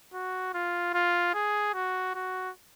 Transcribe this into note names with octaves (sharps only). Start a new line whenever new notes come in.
F#4
F4
F4
G#4
F#4
F#4